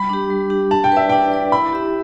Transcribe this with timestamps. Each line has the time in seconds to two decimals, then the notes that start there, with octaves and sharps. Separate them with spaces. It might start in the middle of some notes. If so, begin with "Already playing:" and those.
Already playing: G3 B5
0.09 D4 G4
0.30 G3
0.50 D4 G4
0.71 D4 A5
0.84 G5
0.92 B4 D5 E5
1.09 D4 G5
1.32 B4 D5
1.52 E4 B5
1.73 G4 E5